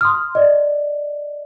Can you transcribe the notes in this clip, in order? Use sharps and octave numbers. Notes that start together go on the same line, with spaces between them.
C6 D#6 F6
D5 D#5